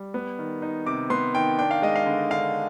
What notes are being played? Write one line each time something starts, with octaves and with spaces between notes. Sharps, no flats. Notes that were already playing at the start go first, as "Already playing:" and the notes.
Already playing: G3
B3
D#3
D#4
C3 D6
B3 C6
D#3 G5
D4 G5
F5
G#3 D#5
F5
D3
D3 F5